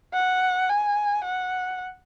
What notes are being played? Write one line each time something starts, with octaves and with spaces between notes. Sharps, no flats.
F#5
G#5
F#5